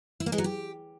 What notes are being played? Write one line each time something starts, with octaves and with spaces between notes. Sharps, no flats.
E4
A#3
G#3
F#3
G4